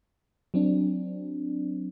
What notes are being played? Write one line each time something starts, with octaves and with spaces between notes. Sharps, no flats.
F#3 C4 D4